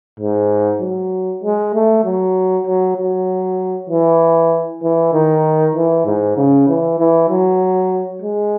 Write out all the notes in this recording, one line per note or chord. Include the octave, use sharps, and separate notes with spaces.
G#2
F#3
G#3
A3
F#3
F#3
F#3
E3
E3
D#3
E3
G#2
C#3
E3
E3
F#3
G#3